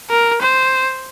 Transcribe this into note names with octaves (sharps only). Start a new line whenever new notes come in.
A#4
C5